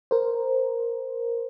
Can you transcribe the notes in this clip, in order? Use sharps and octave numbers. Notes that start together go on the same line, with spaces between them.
A#4 C5